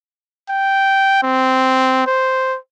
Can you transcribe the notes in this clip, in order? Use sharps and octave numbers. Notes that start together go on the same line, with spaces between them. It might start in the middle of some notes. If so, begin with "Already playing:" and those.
G5
C4
C5